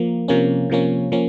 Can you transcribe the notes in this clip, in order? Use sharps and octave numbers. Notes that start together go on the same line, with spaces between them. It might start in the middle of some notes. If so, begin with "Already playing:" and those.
Already playing: F3 A#3
C3 F3 A#3 C#4
C3 F3 A#3 C#4
F3 A#3 C#4